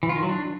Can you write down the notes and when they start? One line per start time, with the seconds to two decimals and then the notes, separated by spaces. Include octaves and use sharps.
0.03 E3
0.09 F4
0.16 D#3
0.23 F#3
0.29 D4